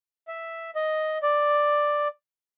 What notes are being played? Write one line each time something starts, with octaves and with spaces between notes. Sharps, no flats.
E5
D#5
D5